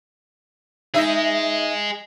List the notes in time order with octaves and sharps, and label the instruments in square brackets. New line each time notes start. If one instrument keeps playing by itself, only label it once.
[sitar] D#4 E5 [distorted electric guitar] G#4 D#5